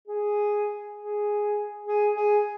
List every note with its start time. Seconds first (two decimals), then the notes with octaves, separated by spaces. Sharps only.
0.08 G#4
0.97 G#4
1.86 G#4
2.15 G#4